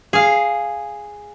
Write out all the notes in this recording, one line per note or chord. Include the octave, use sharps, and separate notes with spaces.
G#4 F5